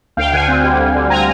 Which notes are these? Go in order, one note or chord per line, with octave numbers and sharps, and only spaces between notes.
D2 F5 G5
D3 F#5 G#5
C4
G3
D2
D3
C4 G#5 A#5